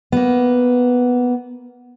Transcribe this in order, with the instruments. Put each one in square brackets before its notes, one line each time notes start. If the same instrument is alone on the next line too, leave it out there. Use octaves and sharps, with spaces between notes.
[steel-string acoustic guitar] A#3 B3